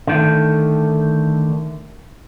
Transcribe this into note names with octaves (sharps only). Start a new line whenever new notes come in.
D3 D#3 A3